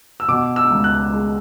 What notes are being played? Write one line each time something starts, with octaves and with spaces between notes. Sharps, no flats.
E6
B2 D6
E6
C#2
F#6
G#3